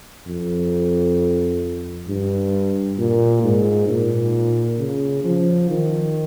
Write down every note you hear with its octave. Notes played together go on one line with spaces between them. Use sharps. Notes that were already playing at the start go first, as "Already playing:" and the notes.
F2
G2
A#2
G#2
A#2
C#3
F3
D#3